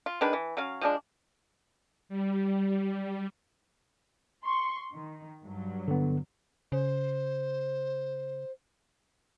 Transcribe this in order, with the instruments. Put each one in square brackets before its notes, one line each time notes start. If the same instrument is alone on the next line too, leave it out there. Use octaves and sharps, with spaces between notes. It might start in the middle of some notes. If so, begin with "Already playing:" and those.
[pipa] F4
D#3 G#3 D4 B4
E3
F#3 C#4 F5
F3 G#3 D4
[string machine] G3
[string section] C6 C#6
D#3
G2 F#3
[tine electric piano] D3 B3
[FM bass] C#3 [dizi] C5